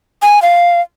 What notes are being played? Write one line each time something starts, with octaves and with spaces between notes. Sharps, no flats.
G#5
F5